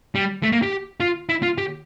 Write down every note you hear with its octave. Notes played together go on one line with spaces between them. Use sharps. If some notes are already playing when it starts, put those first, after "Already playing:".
G3
A3
A#3
G4
F4
E4
F4
G4